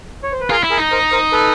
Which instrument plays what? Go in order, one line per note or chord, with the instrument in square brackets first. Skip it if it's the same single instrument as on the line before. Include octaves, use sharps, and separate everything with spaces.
[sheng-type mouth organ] C#5
C5
B4
[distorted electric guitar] F4 [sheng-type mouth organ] G#4 A#4
[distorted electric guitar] E4
[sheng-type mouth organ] G#4 A#4
[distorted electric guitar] D#4
[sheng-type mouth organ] A#4 C5
A#4 C5
A4 B4